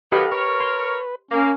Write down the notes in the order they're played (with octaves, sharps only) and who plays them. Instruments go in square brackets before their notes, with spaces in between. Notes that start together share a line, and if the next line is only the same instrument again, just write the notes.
[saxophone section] D#3 F#3 B3 [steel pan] G4 D#5 B5 [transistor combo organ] A4 F5
[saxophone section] A#4 C#5 [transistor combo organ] B4
[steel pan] C6
[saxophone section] A#3 [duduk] C#4